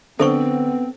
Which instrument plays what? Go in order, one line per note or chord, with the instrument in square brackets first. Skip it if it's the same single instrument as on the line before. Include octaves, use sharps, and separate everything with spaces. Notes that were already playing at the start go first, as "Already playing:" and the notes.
[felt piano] D3 [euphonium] B3 [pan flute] C4 [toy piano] A4 C5 C#6